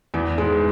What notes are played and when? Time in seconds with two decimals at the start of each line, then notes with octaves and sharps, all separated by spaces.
0.14 E2 E3
0.38 G#2 G#3